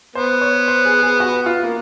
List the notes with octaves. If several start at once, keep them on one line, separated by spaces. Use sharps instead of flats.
B3 C5
C#5
C5
G#4
G#4
F#4
F4
A#3